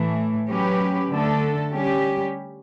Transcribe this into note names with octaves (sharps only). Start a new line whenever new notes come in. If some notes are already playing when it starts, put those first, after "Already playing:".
Already playing: A2 E3 A3
F#3 C#4 G4 B4
D3 A3 D4 A4
G3 C#4 G4